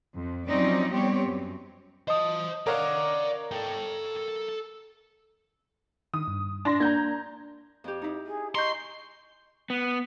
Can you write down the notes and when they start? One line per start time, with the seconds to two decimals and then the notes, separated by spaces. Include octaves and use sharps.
0.16 F2
0.47 F3 F#3 C4 C#4 D#4 D5
0.92 G3 B3 C4 G4 C#5
1.28 F#2
2.08 C5 D#5 A5 D#6
2.67 A#4 C#5 D5 F5 F#5
3.52 A4 G5
6.14 D#3 D#6
6.28 G2
6.65 D4 C6 A#6
6.80 A#3 D4 A#5 G6 G#6
7.84 F2 G4
8.02 D#4 E4
8.26 G#4
8.55 D#5 A#5 C6 C#6 G6
9.70 B3